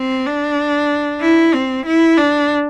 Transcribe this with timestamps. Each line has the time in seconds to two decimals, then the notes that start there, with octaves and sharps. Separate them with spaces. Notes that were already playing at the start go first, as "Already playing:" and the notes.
Already playing: C4
0.26 D4
1.21 E4
1.54 C4
1.86 E4
2.17 D4